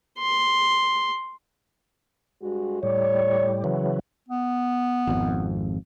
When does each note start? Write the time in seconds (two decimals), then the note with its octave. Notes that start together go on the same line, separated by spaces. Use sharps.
0.19 C6
2.42 G2 G#3 F#4
2.83 A2 G3 C#5 D5
3.64 C#3 E3 F#3
4.29 B3
5.07 G#1 F2